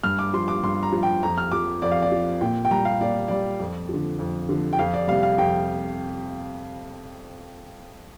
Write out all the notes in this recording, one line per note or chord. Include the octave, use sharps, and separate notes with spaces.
G2 F6
D6
F3 C6
D6
G2 C6
A#5
F3
G5
F2 A#5
F6
F3 D6
F2 D5
F5
D5
F3
A#2 G5
G5
G3 A#5
F5
A#2 D5
G3 D5
F2
D3 F3
F2
D3 F3
G5
F2 F5
D5
C3 G3 F5
F5
F2 G5